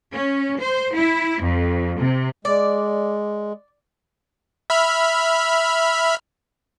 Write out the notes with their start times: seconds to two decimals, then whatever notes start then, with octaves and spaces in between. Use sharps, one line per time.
0.13 C#4
0.60 C5
0.94 E4
1.42 F2
1.98 C3
2.45 G#3 D5
4.70 E5 B5 F6